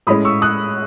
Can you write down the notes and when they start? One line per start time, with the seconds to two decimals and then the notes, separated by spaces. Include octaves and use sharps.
0.07 A2 G#3 C#4 B5 D#6
0.25 C#6 E6
0.42 D#6 F#6